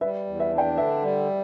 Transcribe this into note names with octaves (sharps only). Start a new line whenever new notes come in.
G3 B4 E5
E2
B4 E5
D4
D5 G5
D3 B4 E5
G3